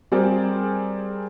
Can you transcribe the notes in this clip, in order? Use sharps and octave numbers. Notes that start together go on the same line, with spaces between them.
G3 C4 G#4 A#4 C5 D5